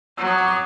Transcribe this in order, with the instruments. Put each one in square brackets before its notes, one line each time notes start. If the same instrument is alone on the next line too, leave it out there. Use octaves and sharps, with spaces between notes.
[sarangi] F#3 [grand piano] E6
[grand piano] D#6
D6
D#6